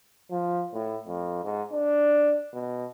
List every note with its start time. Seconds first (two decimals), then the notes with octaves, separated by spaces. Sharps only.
0.31 F3
0.74 A2
1.08 F2
1.44 G#2
1.73 D4
2.53 B2